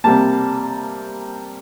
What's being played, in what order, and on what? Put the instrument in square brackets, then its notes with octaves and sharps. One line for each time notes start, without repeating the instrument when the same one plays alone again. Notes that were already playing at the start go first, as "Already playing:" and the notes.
[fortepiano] C3 G3 A#3 A5